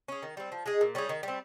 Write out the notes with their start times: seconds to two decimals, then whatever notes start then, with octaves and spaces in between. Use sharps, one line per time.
0.08 C#4 G#4
0.23 D#3
0.37 G3 C4
0.52 F3
0.66 G#3 D#4 G#4
0.81 A#2
0.95 G3 C#4 G#4
1.09 D#3
1.23 G3 C4